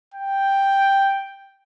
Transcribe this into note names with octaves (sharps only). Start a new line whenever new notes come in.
G5